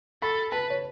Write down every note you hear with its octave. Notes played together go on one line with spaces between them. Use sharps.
A4 B5
B4 A5
C#5